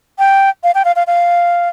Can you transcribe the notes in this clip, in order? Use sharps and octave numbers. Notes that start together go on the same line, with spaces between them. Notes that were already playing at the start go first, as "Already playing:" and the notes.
G5
F5
G5
F5
F5
F5